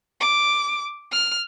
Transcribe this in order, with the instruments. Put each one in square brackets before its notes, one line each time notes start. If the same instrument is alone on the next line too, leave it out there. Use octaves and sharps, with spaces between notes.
[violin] D6
F6